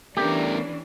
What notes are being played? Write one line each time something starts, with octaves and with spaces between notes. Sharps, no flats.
E3 A3 B3 C#4 D4 G4 A#4